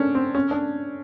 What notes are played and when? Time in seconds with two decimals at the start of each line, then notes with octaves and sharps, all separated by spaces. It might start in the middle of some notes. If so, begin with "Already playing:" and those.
Already playing: C#4 D4
0.15 C4
0.35 C#4
0.51 D4